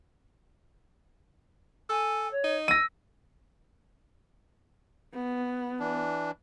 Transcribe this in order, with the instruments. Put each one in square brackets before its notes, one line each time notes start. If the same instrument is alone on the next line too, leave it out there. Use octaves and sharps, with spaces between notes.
[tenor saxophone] A4 [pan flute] G#5
[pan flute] C#5
[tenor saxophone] D#4
[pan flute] E6 [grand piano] A#6 D#7
[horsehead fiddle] B3
[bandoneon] E3 D4